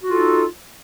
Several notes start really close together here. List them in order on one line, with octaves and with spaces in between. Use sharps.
F#4 F4 A4 D#4